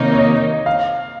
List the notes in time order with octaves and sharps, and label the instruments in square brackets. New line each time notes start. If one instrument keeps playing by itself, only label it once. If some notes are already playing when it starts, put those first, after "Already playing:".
Already playing: [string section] C3 D#3 A#3 D#4 [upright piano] C#5
[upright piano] C#5
D#5
F5